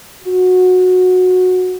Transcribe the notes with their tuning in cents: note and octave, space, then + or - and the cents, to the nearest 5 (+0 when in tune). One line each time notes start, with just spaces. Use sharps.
F#4 -15